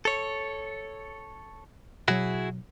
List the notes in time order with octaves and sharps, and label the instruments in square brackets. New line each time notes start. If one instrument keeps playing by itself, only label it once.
[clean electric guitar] A4 C#5
[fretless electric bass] B2 F#3 [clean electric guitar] E4 F#4 G#4